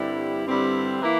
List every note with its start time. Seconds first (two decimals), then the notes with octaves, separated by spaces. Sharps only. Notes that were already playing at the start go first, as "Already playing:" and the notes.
Already playing: G2 D3 G3 C4 E4
0.46 G2 D3 G3 C4 E4
0.99 E3 A#3 E4